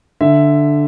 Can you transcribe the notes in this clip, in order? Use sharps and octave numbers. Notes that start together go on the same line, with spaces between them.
D3 E5